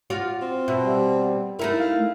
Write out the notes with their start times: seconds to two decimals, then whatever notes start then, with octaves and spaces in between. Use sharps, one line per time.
0.10 F4 F#4 D5
0.42 C4
0.68 B2 E5
0.83 G3
1.59 A3 D#4 E4 A#4
1.79 F5